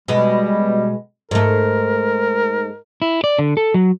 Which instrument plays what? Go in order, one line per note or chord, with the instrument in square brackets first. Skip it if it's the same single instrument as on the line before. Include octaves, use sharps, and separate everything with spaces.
[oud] B2 G#3 [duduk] G3
[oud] G#2 A3 [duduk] A#4
[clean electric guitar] E4
D5
D3
A4
F#3